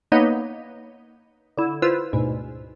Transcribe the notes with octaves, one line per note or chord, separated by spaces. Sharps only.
A#3 B3 D#4 B4 C#5 D#5
D3 E4
E4 F4 B4 C5 E6
D2 G#2 B2